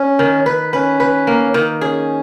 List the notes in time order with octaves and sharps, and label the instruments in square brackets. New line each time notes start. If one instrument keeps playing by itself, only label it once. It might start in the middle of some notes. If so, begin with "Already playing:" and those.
Already playing: [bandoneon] C#4
[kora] D#3
B4
[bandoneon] C#4 [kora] B4
[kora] B4
A#3
D#3
[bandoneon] C#4 [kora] G#4